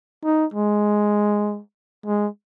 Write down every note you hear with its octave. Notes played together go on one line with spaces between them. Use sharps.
D#4
G#3
G#3